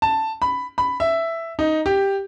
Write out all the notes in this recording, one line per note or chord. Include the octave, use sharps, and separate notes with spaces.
A5
B5
B5
E5
D#4
G4